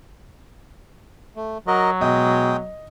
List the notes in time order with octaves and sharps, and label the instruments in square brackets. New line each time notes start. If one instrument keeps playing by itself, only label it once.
[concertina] A3
[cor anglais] F#3 [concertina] F#4 A#4 D#5
[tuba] B2 [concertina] G#3 G5 D#6 [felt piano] D#5